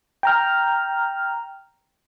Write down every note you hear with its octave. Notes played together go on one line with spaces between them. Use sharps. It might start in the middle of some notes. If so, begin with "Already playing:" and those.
G5 A#5 F6